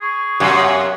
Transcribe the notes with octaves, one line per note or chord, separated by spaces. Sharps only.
G#4 C#6
F#2 G4 F5 F#5 G#5